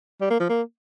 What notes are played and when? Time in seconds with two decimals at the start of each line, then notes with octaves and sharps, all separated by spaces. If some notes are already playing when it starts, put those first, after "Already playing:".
0.21 G3
0.30 A#3
0.40 F3
0.49 A#3